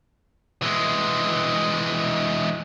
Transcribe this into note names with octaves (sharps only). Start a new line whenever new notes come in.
E3 G#3